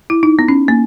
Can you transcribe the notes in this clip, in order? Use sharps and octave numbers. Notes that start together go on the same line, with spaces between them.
E4
D#4
B3
C#4
A#3